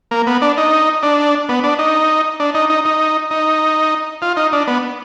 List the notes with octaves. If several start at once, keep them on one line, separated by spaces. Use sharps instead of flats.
A#3
B3
D4
D#4
D4
B3
D4
D#4
D4
D#4
D#4
D#4
D#4
F4
D#4
D4
B3